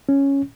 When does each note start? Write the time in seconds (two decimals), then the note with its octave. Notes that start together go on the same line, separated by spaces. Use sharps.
0.09 C#4